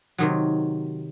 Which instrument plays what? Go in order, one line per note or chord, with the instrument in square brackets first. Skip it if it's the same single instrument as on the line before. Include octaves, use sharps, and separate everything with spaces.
[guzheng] C3 D#3 F#3